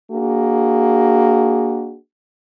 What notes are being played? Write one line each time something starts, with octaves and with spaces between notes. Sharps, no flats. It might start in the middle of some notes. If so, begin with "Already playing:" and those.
A#3 D4 F#4 G#4